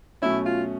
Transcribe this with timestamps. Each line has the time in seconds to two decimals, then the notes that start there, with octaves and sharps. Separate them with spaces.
0.22 B2 F#3 A3 C#4 E4
0.46 F4